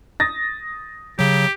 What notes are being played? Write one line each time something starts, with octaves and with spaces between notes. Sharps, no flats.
D#6 A6 A#6
C#3 F#3 G4